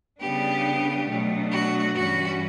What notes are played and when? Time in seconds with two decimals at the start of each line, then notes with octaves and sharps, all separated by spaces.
0.21 C#3 G3 B3 D4 G4
1.09 B2 F#3 A3 D4
1.53 F#4
1.97 G2 E3 G3 C#4 F#4